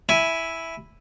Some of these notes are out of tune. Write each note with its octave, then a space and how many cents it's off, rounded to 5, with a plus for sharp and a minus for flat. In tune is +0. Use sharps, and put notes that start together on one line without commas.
E4 +0 G#5 +0